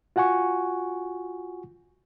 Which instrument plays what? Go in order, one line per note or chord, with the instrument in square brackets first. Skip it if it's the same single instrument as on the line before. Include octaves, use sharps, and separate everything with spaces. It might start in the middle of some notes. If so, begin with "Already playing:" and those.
[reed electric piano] F4 F#4 F#5 G#5 C#6